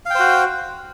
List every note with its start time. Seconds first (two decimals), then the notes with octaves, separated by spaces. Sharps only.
0.06 F5
0.10 G5
0.15 C5
0.20 F#4